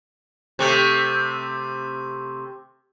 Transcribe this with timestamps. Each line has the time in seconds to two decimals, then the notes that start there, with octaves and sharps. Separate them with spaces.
0.59 C3 A3